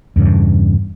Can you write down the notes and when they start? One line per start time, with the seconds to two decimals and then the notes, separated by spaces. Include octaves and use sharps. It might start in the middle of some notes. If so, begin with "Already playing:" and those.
0.16 E2 G2 C#3